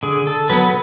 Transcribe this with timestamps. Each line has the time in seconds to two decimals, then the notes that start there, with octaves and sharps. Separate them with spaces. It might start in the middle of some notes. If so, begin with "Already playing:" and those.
0.03 D3 G#4
0.27 A4
0.50 F#3 B3 B4